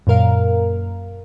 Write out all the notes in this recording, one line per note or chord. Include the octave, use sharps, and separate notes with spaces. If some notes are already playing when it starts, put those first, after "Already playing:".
F#2 A#2 A#4 F5